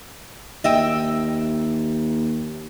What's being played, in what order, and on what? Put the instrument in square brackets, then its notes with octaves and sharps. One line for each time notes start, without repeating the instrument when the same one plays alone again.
[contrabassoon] D#2 [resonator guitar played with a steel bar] D#5 E5 G5